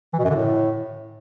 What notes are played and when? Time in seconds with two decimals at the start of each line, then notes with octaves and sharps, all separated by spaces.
0.13 E3
0.19 B2
0.24 F#2
0.30 D3
0.35 A2